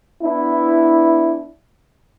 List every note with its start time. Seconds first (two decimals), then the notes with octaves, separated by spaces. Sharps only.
0.22 B3 D4 E4